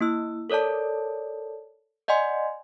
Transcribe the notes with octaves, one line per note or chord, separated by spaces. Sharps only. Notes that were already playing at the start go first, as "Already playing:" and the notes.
A#3 E4 E6
A4 A#4 C#5 D5 A5
D5 D#5 F#5 G#5 C6